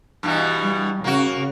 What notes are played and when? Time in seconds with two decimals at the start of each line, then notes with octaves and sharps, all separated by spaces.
0.23 G2 B2 E3
0.62 G3
1.04 C#3 A#3 F#4